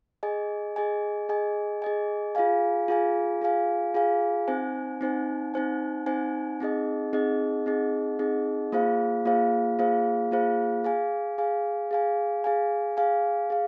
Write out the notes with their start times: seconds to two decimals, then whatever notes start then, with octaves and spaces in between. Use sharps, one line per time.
0.23 G#4 D#5 G#5
0.76 G#4 D#5 G#5
1.29 G#4 D#5 G#5
1.82 G#4 D#5 G#5
2.35 F4 G#4 F5 G#5
2.88 F4 G#4 F5 G#5
3.41 F4 G#4 F5 G#5
3.94 F4 G#4 F5 G#5
4.48 C4 D#4 C5 G#5
5.01 C4 D#4 C5 G#5
5.54 C4 D#4 C5 G#5
6.06 C4 D#4 C5 G#5
6.60 C4 D#4 G#4 D#5
7.13 C4 D#4 G#4 D#5
7.66 C4 D#4 G#4 D#5
8.19 C4 D#4 G#4 D#5
8.72 A#3 F4 G#4 C5 F5
9.25 A#3 F4 G#4 C5 F5
9.79 A#3 F4 G#4 C5 F5
10.31 A#3 F4 G#4 C5 F5
10.84 G#4 F5 G#5
11.38 G#4 F5 G#5
11.91 G#4 F5 G#5
12.44 G#4 F5 G#5
12.97 G#4 F5 G#5
13.50 G#4 F5